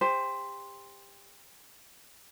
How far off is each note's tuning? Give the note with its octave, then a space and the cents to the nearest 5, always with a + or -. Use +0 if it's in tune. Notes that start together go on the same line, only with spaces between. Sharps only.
G4 +30 C5 +0